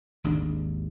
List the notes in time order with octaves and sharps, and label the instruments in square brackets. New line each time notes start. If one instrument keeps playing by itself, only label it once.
[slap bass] G#1 D#2 G#2 D4